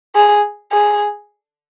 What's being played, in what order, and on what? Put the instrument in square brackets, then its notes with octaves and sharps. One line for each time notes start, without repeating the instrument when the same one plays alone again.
[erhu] G#4
G#4